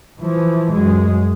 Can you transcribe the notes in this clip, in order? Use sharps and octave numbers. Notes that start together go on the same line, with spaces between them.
E3 F3
F#2 G#3